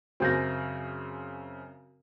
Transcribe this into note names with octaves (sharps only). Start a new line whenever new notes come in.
F#2 C#3 C4 F#4 G6 A#6